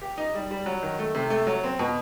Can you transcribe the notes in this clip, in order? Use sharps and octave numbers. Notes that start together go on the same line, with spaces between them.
G4
D#4
G3
G3
F#3
D#3
A3
C3
A3
F#3
C4
B2